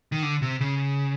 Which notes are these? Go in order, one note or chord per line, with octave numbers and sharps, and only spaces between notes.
D#3
D3
C3
C#3